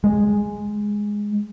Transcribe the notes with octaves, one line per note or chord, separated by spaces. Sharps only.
G#3